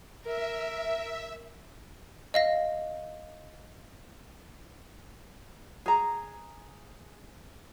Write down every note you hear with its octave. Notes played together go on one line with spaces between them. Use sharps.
A#4 E5
D#5 F5 A#6
G#4 A#5